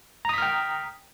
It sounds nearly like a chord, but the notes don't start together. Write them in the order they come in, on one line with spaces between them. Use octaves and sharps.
A#5 D#6 B6 F6 G5